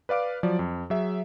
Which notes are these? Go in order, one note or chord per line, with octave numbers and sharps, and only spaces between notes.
B4 D5 F5 D6 D7
F3 F#3 D5
F2
F#3 G#4 E5